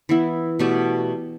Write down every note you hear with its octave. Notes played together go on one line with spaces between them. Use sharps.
E3 B3 E4
B2 A3 G4 D5